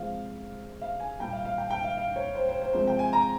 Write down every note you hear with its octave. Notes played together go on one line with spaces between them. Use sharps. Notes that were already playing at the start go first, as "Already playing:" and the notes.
Already playing: C3 F3 G#3 F5
F5
G#5
A#2 G3 G5
F5
F5
G5
G5
F5
F5
C#5
C5
C5
C5
C3 F3 G#3 C5
G5
G#5
A#5